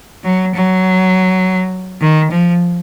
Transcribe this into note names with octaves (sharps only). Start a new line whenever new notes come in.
F#3
F#3
D#3
F3